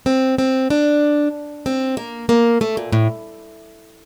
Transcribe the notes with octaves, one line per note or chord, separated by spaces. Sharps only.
C4
C4
D4
C4
A#3
A#3
A3
A#2
A2